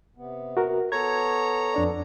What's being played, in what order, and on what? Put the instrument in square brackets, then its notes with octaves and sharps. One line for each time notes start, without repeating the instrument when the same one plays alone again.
[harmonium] C3 B3
[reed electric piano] F#4 A#4
[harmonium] B3 A4 [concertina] C#5 A#5 [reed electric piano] G#6
[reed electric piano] F2 D4 D5